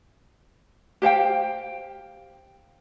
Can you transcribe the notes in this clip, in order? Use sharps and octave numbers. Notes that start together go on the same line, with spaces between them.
G4 C5 F5 G5